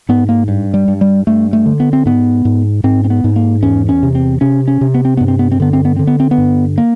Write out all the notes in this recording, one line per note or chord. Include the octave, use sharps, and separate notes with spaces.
G#2 B3
A#3
G2
G3
G2
G3
G2 A3
A3
D3
B3
C4
G#2 B3
G#2
G#2 C4
C4
B3
G#2
A#3
E2 C#4
C#4
C3
C4
C3 C#4
C#4
C3
B3
C4
G2 B3
C4
B3
C4
D3 B3
C4
B3
D3 C4
B3
C4
B3
G2
A#3